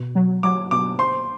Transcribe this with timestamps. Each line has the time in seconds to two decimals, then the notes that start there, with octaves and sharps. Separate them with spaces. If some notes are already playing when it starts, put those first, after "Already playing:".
Already playing: B2
0.15 F#3
0.43 F#3 D6
0.71 B2 D6
0.99 C5 C6